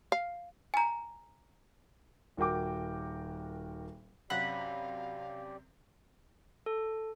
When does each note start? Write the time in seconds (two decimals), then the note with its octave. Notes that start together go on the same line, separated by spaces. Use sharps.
0.12 F5
0.74 G#5 A#5
2.37 D#1 F#4 A#4 G5 D6
4.30 F#2 C3 F#3 G4 D5 F5 F#5 B5
6.66 A4